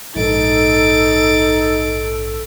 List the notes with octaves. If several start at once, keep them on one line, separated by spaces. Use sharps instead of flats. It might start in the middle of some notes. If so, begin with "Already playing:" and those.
A#1 G#2 D#4 A4 A6 D7